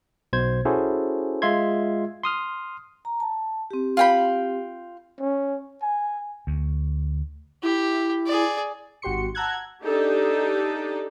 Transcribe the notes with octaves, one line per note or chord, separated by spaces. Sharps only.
B1 B2 C5 G#6
C#4 E4 F#4 G#4 A4 C5
G#3 F4 E5 C6 G#6
C6 D#6 F6
A#5
A5
C4 G4
F4 G5 B5
C#4
G#5
D2
E4 G4
G#4 D5
G#1 F#4 G4 C6 C#7
F#5 A5 A#5 E6 F#6 G#6
D4 D#4 G4 A4